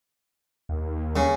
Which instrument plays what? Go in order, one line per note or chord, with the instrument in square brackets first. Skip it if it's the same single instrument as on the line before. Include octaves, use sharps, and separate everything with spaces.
[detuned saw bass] D#2
[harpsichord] C#3